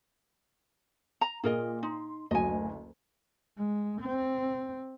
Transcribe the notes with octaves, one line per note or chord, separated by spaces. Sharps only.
A#5
A#2 G#4 A#4 D#5
D#4 C6
F#1 D2 F#3 D#5 G#5
G#3
C4